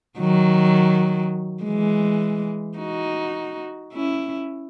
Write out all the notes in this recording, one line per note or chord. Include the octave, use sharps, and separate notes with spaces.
D#3 F#3
E3 G#3
D#4 F#4
C#4 E4